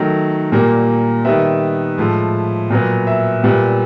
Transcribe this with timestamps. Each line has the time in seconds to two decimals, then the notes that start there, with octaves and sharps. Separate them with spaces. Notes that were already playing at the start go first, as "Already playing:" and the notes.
Already playing: D#3 F#3 A3
0.52 A#2 G3 A#3
1.25 D#3 G3 B3 E5
1.98 A2 F3 G#3
2.70 A#2 F#3 B3
3.07 E5
3.44 A#2 G3 B3